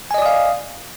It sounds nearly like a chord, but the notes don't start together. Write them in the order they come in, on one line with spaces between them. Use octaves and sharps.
G#5 D#5 D5 D#6 F5